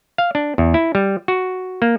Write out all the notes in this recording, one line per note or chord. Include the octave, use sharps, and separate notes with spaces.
F5
D4
E2
E4
G3
F#4
A#3